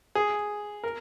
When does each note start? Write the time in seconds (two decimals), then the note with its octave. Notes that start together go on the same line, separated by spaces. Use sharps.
0.15 G#4
0.84 A#4